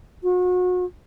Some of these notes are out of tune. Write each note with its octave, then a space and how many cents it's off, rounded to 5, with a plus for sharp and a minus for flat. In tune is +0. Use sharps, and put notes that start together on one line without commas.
F#4 -35